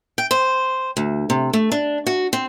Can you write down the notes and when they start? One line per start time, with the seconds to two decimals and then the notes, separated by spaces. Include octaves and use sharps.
0.18 G5
0.31 C5
0.97 D2
1.30 C3
1.53 A3
1.72 D4
2.07 F#4
2.33 C4